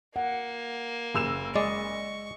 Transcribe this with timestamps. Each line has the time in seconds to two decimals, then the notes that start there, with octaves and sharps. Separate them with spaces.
0.16 A#3 F#5
1.14 F#1 E6 E7
1.56 G#3 D5 D#5 C#6